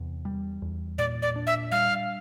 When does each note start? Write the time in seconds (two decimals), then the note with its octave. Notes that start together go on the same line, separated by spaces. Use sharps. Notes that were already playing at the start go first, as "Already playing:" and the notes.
Already playing: E2 C3
0.25 G3
0.62 E2
0.98 A#2 D5
1.22 D5
1.36 D4
1.47 E5
1.72 G3 F5